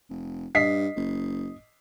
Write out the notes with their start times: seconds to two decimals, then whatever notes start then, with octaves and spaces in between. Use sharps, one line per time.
0.10 F1
0.55 G2 D#5 B6 C7
0.96 F#1